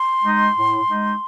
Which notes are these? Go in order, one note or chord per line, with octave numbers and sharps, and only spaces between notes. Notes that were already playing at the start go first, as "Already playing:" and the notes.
Already playing: C6
G#3 D#4
A2
G#3 D#4